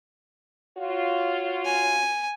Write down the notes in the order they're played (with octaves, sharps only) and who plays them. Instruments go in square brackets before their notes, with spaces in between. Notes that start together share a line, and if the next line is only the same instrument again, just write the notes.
[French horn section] F4 F#4 C#5
[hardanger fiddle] G#5